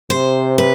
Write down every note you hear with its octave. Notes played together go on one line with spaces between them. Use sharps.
C3 C5
B4